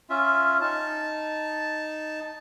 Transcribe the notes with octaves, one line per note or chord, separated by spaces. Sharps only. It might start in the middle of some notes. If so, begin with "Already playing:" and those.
C#4 F4 E5
D#4 A5